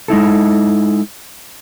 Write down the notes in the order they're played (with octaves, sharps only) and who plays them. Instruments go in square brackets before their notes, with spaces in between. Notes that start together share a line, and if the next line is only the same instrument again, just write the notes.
[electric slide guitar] G#3 D#4 E4 A4